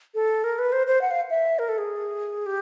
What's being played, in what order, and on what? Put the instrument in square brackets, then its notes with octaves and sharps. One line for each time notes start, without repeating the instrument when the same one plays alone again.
[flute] A4
A#4
B4
C5
C5
F#5
F5
E5
A#4
A4
G#4
G4